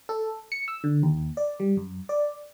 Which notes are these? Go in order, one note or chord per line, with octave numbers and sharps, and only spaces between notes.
A4
C#7
E6
D3
D#2
D5
G3
F#2
D5